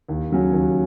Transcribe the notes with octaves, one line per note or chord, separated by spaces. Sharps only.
D#2
C#3 F#3 C#4
D#2